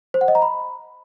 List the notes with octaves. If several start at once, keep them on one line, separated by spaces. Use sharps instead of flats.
C5
F#5
D#5
A#5
B5